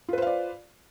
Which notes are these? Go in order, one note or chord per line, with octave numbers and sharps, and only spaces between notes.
F4 B4 C5 D5 F5